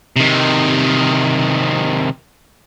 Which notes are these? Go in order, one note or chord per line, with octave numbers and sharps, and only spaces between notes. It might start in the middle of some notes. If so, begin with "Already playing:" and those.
C3 D#3